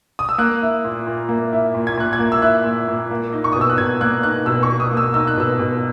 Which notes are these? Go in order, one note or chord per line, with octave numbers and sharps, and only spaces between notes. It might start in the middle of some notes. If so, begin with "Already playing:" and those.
D#6
E6
A#3 F#6
E4
A#2
A#2
A#3
E4
A#2
G#6
A#2 F#6
G#6
A#3
E6
E4 F#6
A#2
A#2
A#3
D#4
C#6
B2 D#6
E6
F#6
B2 G#6
A#3 F#6
D#4 F#6
B2 E6
C#6
B2
D#6
A#3
E6
D#4 E6
F#6
B2 E6
B2